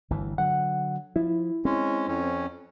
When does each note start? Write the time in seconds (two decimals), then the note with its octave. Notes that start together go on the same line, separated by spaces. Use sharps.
0.10 G1 D2 E3
0.38 D3 F#3 F#5
1.16 F3 E4
1.65 G#3 C4 C#4
2.08 F2 C#4